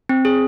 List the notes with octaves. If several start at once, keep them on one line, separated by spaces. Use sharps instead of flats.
C4
G#4